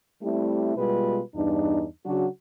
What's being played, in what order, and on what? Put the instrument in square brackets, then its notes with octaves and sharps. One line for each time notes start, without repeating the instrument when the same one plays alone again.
[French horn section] G3 A3 C4 E4 G4
B2 G3 G#3 F4 B4
E2 G2 D4 D#4
C#3 F#3 D4 F#4